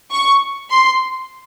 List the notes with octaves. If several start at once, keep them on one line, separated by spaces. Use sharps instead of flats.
C#6
C6